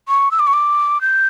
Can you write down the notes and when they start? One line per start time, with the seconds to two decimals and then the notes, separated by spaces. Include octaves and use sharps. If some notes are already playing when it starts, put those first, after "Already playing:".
0.08 C#6
0.31 E6
0.39 D6
0.47 C#6
0.53 D6
1.01 G6